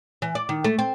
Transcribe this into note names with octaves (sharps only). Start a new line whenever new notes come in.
E3
D5
D#3
A3
C4